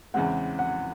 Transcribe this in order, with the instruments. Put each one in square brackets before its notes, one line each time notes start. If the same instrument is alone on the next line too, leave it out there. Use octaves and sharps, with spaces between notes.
[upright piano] E2 C#3 E3 G#3 C4 [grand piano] F#5
[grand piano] F#5